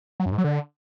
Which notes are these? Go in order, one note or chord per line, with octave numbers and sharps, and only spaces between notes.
F#3
F#2
G#2
F#3
D3